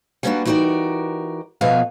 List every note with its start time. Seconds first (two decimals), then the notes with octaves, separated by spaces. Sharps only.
0.23 G3 A#3 B3 C#4 D4 F#4
0.45 E3 D#4 F#4 G4 A#4 D5
1.61 B2 F3 B3 B4 E5 F5